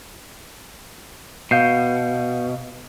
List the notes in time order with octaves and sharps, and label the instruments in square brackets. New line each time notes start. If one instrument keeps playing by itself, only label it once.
[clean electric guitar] B2 [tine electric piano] F5 G6 C7